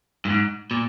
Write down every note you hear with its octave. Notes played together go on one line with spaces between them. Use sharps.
G2
G#2
A#2